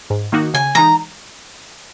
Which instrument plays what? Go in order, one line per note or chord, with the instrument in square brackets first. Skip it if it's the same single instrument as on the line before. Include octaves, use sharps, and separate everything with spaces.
[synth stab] G#2
D#3 A#3 D#4 F#4
[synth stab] C#3 [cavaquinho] G#5
[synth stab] E3 G#3 D#4 [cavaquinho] A#5